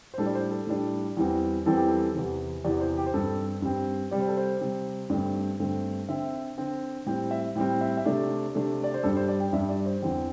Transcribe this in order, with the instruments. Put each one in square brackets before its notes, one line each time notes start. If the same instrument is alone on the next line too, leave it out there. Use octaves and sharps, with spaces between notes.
[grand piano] C5
A2 G3 D4 A4
D5
C5
A4
A2 G3 D4
E2 E3 G3 C4
E2 E3 G3 C4 A4
G4
A4
E2 C3 E3
E2 C3 E3 D5
C5
G4
C5
G2 G3 C4 A4
G2 G3 C4
C3 G3 C4 D5
C5
A4
C5
C3 G3 C4
G2 D3 A3 C4 D5
G2 D3 A3 C4
D3 C4 E5
D3 C4
A2 G3 C4 G5
E5
A2 G3 C4 G5
E5
E5
C3 A3 D4 D5
C3 A3 D4
D5
C5
G2 G3 D4 A4
C5
D5
G5
G2 G3 D4 E5
D5
C5
E2 D3 C4